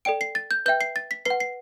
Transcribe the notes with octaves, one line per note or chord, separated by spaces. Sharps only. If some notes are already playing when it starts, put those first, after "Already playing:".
A4 D5 G5 D7
C7
A6
G6
B4 E5 G5 G6
C7
A6
B6
B4 F#5 C7
C7